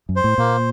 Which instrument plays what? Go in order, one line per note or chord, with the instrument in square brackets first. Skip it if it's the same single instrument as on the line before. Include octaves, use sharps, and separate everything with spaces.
[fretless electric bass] F#2
[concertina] C5
[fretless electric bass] A2
[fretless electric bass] A#2 [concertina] A#3